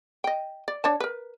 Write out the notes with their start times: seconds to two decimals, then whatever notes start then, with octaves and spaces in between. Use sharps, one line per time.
0.24 D#5 G5
0.68 D5
0.84 D4 C#5 A5
1.00 A#4 B4